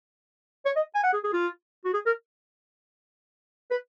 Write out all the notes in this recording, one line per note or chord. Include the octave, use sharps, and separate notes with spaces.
C#5
D#5
G#5
F#5
G#4
G#4
F4
F#4
G#4
A#4
B4